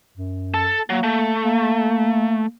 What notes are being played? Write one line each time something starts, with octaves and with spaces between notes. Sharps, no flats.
F#2
A4 A5
F#3 A#3
A3
A#3